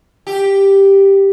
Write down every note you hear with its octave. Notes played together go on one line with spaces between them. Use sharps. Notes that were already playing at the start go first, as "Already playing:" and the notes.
G4